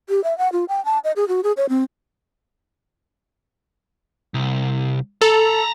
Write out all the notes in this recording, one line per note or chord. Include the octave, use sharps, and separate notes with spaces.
G4
E5
F#5
F4
G5
A5
D#5
G#4
F#4
G#4
C#5
C4
C2
A4 A5 A#5